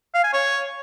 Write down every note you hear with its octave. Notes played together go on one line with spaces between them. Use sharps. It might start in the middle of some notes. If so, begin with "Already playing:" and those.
F5
G#5
C#5